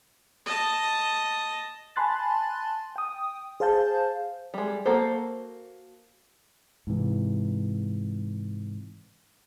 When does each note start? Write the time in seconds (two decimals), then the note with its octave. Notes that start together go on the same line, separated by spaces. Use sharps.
0.46 D#5 A5
1.96 G#5 A5 B5 C6 F#6 A6
2.96 G5 D#6
3.60 G#4 C5 F5 A5 G6
4.54 G3 G#3
4.85 A#3 F#4 A4 C5
6.87 G#2 C3 E3